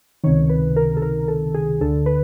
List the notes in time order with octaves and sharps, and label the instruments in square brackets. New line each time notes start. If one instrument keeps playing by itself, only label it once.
[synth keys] C#2 C3 D#3 C#5
B4
A#4
A4
A#4
A4
G#4
D2 D3 A4
B4